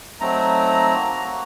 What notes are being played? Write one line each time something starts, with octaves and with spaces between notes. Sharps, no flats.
F#3 A3 C4 D#4 A#5
A#3 F#4